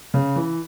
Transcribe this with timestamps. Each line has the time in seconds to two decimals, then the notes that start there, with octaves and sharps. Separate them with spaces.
0.14 C#3
0.36 E3